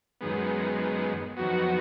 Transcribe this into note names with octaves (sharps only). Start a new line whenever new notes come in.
F#2 D#3 G#3 B3
F2 D#3 F#3 B3 F#4